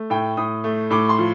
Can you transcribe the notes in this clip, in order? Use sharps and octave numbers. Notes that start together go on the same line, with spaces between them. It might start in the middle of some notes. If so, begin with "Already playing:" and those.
Already playing: A3
A2 G5
A2 D#6
A3
A2 D6
C6
F3